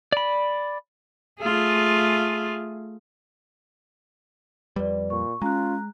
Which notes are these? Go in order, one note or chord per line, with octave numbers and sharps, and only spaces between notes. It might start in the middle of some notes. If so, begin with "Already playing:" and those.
D5 B5
A3 F4 G#4
F2 G3 B4 D5
A#2 C#6
G#3 C#4 F4 A#5 F#6